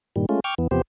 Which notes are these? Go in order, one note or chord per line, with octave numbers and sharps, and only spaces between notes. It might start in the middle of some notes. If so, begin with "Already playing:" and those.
G2 A#2 D#3 G3
G#3 A3 C#4 F4
G5 C#6 D6 F6
E2 E3 B3
E2 C3 F3 B3 G4 C5